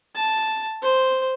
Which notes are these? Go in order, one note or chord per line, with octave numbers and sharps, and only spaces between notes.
A5
C5